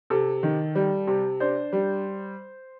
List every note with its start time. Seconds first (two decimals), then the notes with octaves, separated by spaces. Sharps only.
0.10 C3 A4
0.43 D#3
0.75 G3
1.07 C3
1.40 D4 C5
1.73 G3